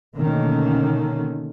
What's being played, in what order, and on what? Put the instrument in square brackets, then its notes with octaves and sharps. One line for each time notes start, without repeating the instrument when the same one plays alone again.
[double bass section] B2 D3 D#3 A3 A#3 C#4